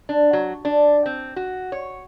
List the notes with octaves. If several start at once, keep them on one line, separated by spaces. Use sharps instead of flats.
D4
F#3
D4
C4
F#4
C#5